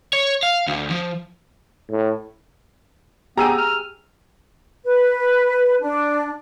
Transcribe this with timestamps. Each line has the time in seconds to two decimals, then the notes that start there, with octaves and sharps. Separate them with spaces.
0.13 C#5
0.43 F5
0.67 D2
0.91 F3
1.90 A2
3.38 B3 G4 G#4 G5 A#5 E6 D#7
3.58 F6
4.84 B4
5.81 D4